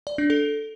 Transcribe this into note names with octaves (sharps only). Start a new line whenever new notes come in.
D5
D4
A4